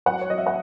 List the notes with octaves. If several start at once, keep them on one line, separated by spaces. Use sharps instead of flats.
F#3 F#5
C#5
F#3 D#5
E5
F#5